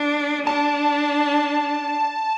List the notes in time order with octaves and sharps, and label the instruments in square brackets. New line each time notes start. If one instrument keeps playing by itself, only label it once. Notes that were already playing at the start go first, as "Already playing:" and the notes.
Already playing: [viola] D4
[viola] D4 [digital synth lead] A5